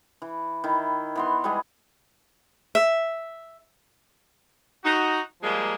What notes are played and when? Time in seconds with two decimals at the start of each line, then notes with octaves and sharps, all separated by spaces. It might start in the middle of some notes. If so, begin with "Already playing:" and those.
0.22 E3
0.64 D#3 E4
1.15 E3 B3 C6
1.44 G3 G#3 B3 G#4
2.75 E5
4.84 D#4 F#4
5.42 F3 G3 G#3 A#3